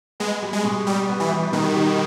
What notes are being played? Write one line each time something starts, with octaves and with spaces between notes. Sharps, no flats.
G#3 B3
G3
G#3
B2
G3 G4
B3
E3
G3
B2 D#3
G4